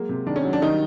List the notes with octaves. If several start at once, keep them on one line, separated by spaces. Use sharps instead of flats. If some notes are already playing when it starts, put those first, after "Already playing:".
Already playing: F#3 G#3 A#3
C3
D#3 D4
C#4
F#3
D4
D#3 G3 D#4